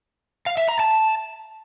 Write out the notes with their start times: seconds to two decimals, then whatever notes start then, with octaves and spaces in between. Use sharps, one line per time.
0.46 F5
0.57 E5
0.69 A#5
0.80 A5